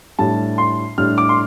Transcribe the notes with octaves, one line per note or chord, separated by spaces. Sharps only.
A2 G3 D4 A5
C6
A2 G3 D4 F6
D6
C6